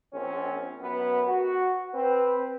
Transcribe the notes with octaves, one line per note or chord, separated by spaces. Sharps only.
A#1 C4 C#4
F#2 B3
F#4
C4 B4